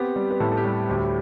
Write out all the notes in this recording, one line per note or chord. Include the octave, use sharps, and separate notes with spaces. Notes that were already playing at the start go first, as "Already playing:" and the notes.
Already playing: B3 C4 G4
G3
B4
A2 A4
A4
G4
G3
D2 G4